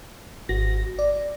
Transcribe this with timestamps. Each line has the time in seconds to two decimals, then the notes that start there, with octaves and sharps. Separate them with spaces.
0.49 G#1 F#4 A#6
0.99 D5